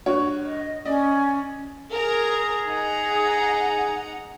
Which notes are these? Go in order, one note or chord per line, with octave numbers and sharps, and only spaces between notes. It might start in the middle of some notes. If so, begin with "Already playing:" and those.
G2 F#4 C#5
D#5
C#4 D5 D#5
G#4 A#4 A#5
D#4 F#5 A#5